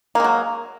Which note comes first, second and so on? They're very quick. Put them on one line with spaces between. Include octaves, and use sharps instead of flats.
A#3 G#3 F#3